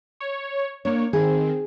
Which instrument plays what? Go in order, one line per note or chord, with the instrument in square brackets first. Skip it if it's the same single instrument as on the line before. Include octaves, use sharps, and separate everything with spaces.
[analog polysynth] C#5
[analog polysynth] A#3 C#5 [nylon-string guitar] D4
[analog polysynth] D#3 C4 [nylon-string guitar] G#4